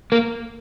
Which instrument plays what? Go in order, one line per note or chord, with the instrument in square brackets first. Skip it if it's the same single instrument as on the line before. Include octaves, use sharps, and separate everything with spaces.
[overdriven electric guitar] A#3